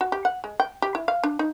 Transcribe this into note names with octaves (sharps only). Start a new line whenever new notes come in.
F#4
G4
F#5
G#3
G5
G4
E4
F5
D4
D#4